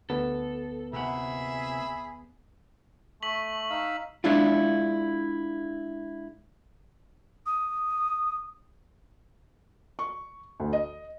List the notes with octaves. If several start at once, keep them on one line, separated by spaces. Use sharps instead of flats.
D2 B3 A4
C3 A#3 G#4 E5 F#5 B5
A3 C#6 B6 F#7
D#4 F5 E6
G#3 D4 E4 F4
D#6
C#6
D2
D#5